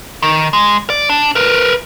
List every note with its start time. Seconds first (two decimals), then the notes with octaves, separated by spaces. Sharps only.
0.22 D#3
0.53 G#3
0.90 D5
1.10 D4
1.35 A#4 B4